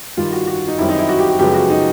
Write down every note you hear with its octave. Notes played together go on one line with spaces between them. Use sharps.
G2 D#3 G3 F4
F#4
F#4
D#4
F#2 D#3 G3 C4 E4
D#4
E4
F#4
G4
G4
F#2 C#3 F3 G#3 B3 G4
F#4
D#4